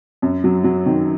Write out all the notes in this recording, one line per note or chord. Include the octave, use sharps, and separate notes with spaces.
F#2
F#3
F#3
D#3